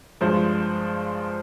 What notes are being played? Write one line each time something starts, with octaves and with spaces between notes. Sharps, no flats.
G2 F3 G#3 C5